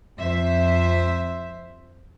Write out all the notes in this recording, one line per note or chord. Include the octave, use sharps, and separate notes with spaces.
F2 C5 E5